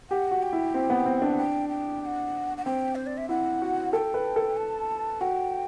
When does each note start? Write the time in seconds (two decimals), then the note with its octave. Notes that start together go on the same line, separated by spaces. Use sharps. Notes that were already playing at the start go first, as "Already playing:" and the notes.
0.10 G4 F#5
0.31 F#4
0.42 G5
0.53 E4
0.74 C4
0.90 B3
1.06 C4
1.22 D4
1.37 G5
1.69 G5
2.01 G5
2.06 F#5
2.57 F#5
2.65 C4 G5
2.95 C5
3.06 D5
3.17 E5
3.29 E4 F#5
3.62 F#4
3.93 A4 G5
4.14 B4
4.36 A4
4.57 A5
5.21 F#4 G5